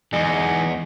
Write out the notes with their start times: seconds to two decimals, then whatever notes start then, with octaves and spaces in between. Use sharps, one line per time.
0.13 E2 E3 G#3 D#4 D#5 G#5